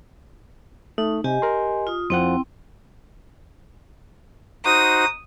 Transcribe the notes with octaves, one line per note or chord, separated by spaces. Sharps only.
A3 D#4
C3 G4 D#5 G#5
A#4 C6
F4 D#6
F2 F3 C4 E4 F#5 G5
D#4 F#4 C5 D#6